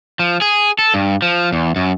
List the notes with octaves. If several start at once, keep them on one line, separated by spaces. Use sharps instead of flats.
F3
G#4
A4
G2
F3
E2
F#2